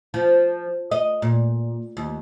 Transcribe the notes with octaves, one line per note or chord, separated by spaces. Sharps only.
F3
D#5
A#2
D#2